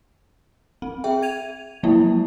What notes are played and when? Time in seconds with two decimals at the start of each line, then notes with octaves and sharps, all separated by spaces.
0.82 C4
1.04 G#4 E5 G5
1.22 G#6 D#7 F7
1.83 F3 F#3 G#3 A#3 E4